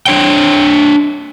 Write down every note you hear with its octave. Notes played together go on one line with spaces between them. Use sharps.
D4 C#5 G5